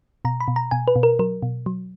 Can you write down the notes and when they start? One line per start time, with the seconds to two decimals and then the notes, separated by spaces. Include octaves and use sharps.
0.25 B2 A#5
0.40 B5
0.48 B2
0.56 A#5
0.71 B2 G#5
0.88 B4
0.96 B2
1.03 A#4
1.19 F#3 A#4
1.42 B2
1.66 F#3